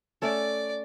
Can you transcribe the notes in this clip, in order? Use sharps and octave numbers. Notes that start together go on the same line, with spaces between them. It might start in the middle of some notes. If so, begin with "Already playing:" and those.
A3 C#4 A4 D5